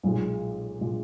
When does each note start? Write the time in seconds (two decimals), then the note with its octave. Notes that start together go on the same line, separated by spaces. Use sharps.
0.03 B1 A#2 G#3
0.81 A#2 G#3